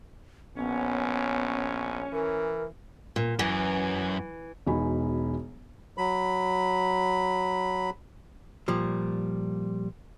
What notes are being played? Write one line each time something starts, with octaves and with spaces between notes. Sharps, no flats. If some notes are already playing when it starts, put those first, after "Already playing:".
A#1 B3 C#4
E3 A#4
A#2
F#2 E3
E1 B2 D#4 G#5 B5
F#3 B5
A#2 F3 G3